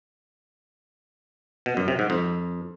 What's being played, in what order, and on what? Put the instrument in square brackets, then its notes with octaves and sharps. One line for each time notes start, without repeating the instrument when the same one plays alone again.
[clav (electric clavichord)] B2
F#2
C3
G#2
F2